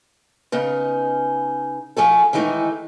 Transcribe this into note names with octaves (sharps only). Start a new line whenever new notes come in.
C#3 B3 D#4
F3 A3 G#4 A4
D#3 E3 G#3 A3 D#4